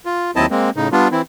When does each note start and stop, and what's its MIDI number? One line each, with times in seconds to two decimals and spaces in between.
0.05 0.31 65
0.36 0.46 39
0.36 0.46 54
0.36 0.46 60
0.36 0.46 64
0.36 0.46 75
0.36 0.46 81
0.51 0.70 56
0.51 0.70 58
0.51 0.70 60
0.76 0.88 45
0.76 0.88 49
0.76 0.88 63
0.92 1.08 55
0.92 1.08 59
0.92 1.08 62
0.92 1.08 65
1.12 1.22 52
1.12 1.22 60
1.12 1.22 64